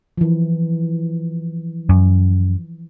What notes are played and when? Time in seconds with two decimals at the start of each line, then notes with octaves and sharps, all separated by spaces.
0.18 E3 F3
1.89 F#2